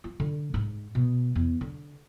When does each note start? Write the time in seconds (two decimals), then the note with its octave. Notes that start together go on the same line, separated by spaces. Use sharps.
0.04 F4
0.20 D3
0.54 G#2
0.95 B2
1.36 E2
1.61 D3